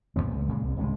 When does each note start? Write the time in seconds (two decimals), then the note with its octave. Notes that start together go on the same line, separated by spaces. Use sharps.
0.16 B1 G2 A#2 B3
0.32 C#2
0.48 A#2 C#3 G#3
0.64 C2
0.77 G#1 C#2 A2 C3